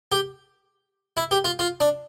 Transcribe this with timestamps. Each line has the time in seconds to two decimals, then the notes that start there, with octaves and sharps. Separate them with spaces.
0.12 G4
1.17 E4
1.31 G4
1.45 F4
1.59 F4
1.80 D4